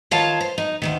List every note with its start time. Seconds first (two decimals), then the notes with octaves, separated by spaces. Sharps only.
0.11 D#3 F4 C#5 F5 A5
0.41 C5
0.58 D#4
0.82 D2 G#2 D#3